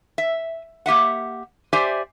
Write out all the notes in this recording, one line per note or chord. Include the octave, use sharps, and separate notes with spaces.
E5
A#3 G4 E5 F#5
G4 C5 D5 E5 G#5